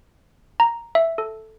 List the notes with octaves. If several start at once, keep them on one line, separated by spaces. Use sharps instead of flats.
A#5
E5
A4